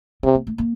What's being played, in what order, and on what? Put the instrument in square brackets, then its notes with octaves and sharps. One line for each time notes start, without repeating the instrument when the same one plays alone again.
[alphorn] C3 [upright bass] C4
[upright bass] A#3
A3
A#3